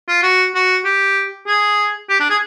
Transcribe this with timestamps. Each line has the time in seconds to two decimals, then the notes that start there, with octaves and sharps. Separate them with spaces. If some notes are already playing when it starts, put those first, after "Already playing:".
0.08 F4
0.23 F#4
0.55 F#4
0.85 G4
1.47 G#4
2.09 G4
2.20 D4
2.30 G#4